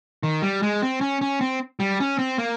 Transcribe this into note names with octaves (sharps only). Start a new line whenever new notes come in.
D#3
G3
G#3
C4
C#4
C#4
C4
G3
C#4
C4
A#3